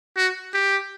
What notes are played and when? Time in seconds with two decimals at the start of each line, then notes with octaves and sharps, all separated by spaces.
0.16 F#4
0.54 G4